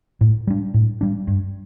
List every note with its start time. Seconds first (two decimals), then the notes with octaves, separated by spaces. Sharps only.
0.21 A2
0.47 G3 D4
0.74 A2
1.01 G3 D4
1.27 G2